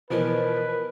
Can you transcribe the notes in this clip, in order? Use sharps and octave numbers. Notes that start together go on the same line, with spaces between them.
B2 E3 F3 A#4 B4